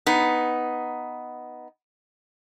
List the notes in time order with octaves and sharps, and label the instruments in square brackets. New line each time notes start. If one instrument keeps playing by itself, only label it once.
[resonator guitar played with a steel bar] B3 D#4